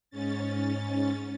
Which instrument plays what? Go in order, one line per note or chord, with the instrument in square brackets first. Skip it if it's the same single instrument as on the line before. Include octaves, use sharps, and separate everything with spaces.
[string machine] G#2 C#4 A6